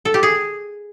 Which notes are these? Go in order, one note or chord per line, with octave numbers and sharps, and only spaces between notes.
A4
G4
G#4